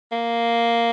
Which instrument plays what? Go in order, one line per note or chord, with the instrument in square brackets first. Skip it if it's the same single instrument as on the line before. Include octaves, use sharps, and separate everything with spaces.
[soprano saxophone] A#3